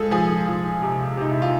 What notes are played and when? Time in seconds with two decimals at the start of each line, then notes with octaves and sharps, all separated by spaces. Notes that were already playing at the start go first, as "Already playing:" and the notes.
Already playing: F3 G#3 G#4 A4
0.11 F3 G#4
0.47 F3
0.82 C3
1.17 C3 D#4
1.31 E4
1.42 F4